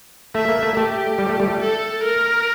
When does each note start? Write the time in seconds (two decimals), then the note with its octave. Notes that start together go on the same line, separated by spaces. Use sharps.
0.35 A3 E5
0.49 A#3
0.63 A3
0.77 A3 G4
1.18 G3
1.29 A3
1.40 G3
1.50 A3
1.60 A4
2.03 A#4